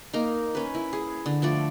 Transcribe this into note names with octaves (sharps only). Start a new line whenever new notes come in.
A#3 D#4 A#4
C#4 B4
E4
G#4
D3
F3 A3 D5